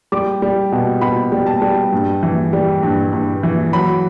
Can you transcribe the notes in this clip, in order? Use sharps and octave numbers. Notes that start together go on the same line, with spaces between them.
G3 D6
G3
B2
B2 B5
G3
A5
G3
G2
E3
G3
G2
G2
E3
F#3 B5